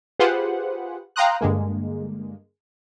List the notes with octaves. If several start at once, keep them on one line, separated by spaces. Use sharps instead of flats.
F4 G4 G#4 B4 C5 F#5
F5 G5 A#5 C6 D#6 F#6
G2 D3 G#3 A#3